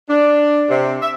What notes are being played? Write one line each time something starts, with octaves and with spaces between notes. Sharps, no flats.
D4
C3
E5